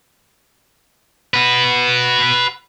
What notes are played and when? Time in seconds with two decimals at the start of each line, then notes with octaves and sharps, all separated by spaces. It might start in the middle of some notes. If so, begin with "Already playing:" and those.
1.34 F#4 B4